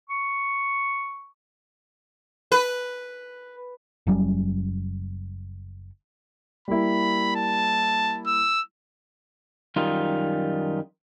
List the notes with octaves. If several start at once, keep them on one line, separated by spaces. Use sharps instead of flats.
C#6
B4
F#1 F#3 G3 C#4
G3 A#3 E4 B5
A5
E6
F#2 D#3 G3 D#4 F4